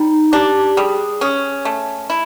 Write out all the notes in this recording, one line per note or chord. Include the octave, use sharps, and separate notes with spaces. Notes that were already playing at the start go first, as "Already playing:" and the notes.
Already playing: G3 D#4
D4 G4
G3 G#4
C#4
A3
E4